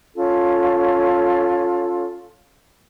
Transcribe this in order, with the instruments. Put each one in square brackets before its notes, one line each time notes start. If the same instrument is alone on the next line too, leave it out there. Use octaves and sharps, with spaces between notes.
[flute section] C#4 F4 A4